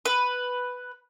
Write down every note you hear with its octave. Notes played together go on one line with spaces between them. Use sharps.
B4